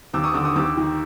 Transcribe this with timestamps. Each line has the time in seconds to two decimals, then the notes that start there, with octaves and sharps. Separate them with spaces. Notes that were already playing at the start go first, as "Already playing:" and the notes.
0.13 D#2 D6 E6
0.24 C#6 D#6
0.34 D3 D6 E6
0.45 C#6 D#6
0.55 D#2 D6 E6
0.77 D#3